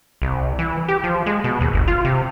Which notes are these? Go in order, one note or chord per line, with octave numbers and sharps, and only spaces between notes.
C2
E3
G4
F3
G#3
B2
D#2
G1
F4
C3